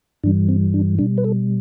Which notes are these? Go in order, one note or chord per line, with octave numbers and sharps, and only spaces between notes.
G2 E3 G3 D4
C4
D4
B2 G3 D4
B4
A4